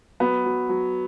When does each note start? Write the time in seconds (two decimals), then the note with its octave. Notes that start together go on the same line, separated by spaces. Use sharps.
0.20 F#3 B3
0.45 F#3
0.69 F#3